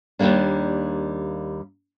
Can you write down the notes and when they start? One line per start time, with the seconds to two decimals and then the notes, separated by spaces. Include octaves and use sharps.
0.19 D#2 G#2 G3 A#3 D4